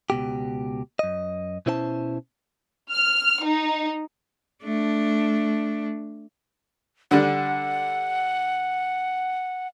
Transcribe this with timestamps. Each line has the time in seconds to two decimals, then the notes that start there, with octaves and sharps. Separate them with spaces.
0.10 C#2 B2 G4
0.99 F#2 D#5
1.66 B2 C#4 E4 C5 C#5 A5
2.91 F6
3.43 D#4
4.63 A3 D4
7.11 D3 G3 D4 F#5